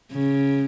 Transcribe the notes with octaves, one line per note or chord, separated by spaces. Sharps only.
C#3